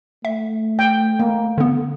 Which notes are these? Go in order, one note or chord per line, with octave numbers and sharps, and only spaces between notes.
A3 E5
G5
A#3
D3 B3